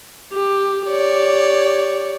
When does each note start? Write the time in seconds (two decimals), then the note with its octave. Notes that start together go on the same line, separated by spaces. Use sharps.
0.33 G4
0.87 G4 C#5 D5